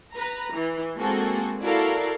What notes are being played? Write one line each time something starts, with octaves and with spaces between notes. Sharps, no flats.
B4 A#5
E3
G#3 A#3 C4 F#4 G#4 A4
E4 F#4 A4 A#4 D5 F5